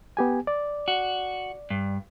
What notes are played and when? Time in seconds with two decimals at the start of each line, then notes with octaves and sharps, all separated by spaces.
0.17 B3 G4 G#5
0.47 D5
0.88 F#4
1.70 G2